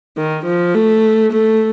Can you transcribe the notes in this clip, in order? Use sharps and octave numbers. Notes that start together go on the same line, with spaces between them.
D#3
F3
A3
A3